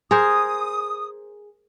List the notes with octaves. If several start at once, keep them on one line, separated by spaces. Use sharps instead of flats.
G#4 A#4 C5 D#6